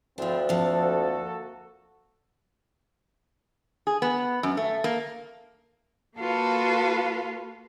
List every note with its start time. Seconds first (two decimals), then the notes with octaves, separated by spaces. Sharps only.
0.18 D2 F3 C4 D4 E4
0.49 F2 F3 A#3 F#4 A4
3.87 G#4
4.02 B3
4.43 F#2
4.57 A3
4.84 A#3
6.17 A#3 F4 F#4 A4 B4